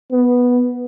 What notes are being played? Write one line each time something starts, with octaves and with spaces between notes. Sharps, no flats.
B3